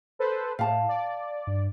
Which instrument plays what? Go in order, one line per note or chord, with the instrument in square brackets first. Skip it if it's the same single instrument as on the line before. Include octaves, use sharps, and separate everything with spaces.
[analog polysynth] A4 B4 C5
[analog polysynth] A2 [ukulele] F5 A5
[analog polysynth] D5
[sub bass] G2